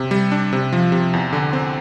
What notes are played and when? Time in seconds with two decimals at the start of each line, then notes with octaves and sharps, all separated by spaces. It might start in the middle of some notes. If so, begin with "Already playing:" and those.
Already playing: C3
0.11 G3
0.32 D4
0.53 C3
0.73 F3
0.92 C3
1.13 E2
1.33 D3
1.53 C4